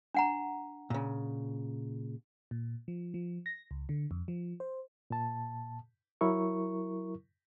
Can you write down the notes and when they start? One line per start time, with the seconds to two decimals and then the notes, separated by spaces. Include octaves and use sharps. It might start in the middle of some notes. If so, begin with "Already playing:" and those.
0.14 D4 F#5 A#5
0.90 A#2 C#3
2.51 A#2
2.88 F3
3.14 F3
3.46 A#6
3.71 C#2
3.89 D3
4.11 F2
4.28 F3
4.60 C5
5.10 A#2 A5
6.21 F#3 E4 A#4 C#6